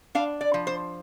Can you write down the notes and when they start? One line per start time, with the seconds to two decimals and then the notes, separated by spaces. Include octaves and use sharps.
0.15 D4 F5
0.41 D5
0.54 F3
0.67 C5